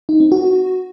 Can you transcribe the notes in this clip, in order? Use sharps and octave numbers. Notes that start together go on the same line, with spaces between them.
D#4
C4
F#4